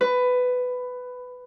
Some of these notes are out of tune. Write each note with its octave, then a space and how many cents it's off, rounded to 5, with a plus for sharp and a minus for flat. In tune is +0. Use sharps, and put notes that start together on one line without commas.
B4 +15